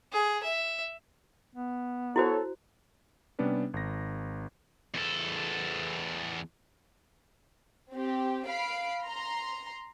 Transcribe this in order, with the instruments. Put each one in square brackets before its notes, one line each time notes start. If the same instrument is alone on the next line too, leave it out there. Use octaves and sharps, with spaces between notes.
[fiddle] G#4
E5
[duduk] B3
[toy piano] E4 F#4 C5 [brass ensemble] A4 C#5
[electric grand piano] C3 G3 B3 C#4 D4 B4
G#1 A#6
[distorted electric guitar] E2 A4
[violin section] C4 G4
F5 B5 C7 D7
A#5 C6